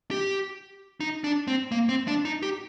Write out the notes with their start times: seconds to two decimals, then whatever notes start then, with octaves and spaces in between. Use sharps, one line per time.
0.11 G4
1.00 D#4
1.24 D4
1.48 C4
1.72 A#3
1.89 C4
2.08 D4
2.25 D#4
2.42 G4